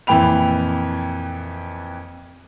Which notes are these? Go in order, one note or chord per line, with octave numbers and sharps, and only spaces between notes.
F2 A#2 E3 G5 B5 F7